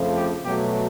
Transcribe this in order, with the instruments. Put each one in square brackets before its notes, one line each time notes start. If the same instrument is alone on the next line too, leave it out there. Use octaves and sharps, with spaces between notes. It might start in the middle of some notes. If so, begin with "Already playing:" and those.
Already playing: [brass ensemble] F2 C#3 F3 A3
G4
B2 F#3 A3 G4